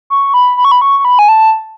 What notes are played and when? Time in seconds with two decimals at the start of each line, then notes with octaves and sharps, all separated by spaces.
0.10 C#6
0.34 B5
0.57 B5
0.65 C#6
0.71 B5
0.81 C#6
0.99 C#6
1.05 B5
1.19 G#5
1.28 A5